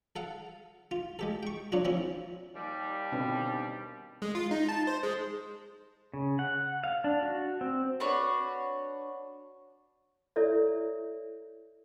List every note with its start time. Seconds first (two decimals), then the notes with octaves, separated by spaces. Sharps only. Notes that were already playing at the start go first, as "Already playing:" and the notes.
0.16 A4 F5 F#5
0.91 F4
1.19 G#3 G4 A4
1.43 G5 C#6
1.72 F#3 D4 F4 F#4
1.85 F3 C4 C#4 E4
2.55 D#2 G3
3.12 B2 D3 C4
4.22 G#3
4.35 F4
4.51 D#4
4.69 A5
4.87 C5
5.03 G#3
6.14 C#3
6.39 F#5
6.84 F5
7.04 D4
7.23 F#4
7.61 C4
8.00 D4 F#4 B4 C#5
10.36 E4 A4 C#5 D5 E5